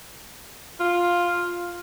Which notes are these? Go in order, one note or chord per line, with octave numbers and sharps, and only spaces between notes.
F4